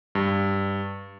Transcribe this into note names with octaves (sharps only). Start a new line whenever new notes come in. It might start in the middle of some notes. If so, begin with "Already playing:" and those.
G2